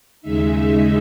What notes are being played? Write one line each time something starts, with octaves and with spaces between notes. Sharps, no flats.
D#2 C#3 G#3 D#4 E5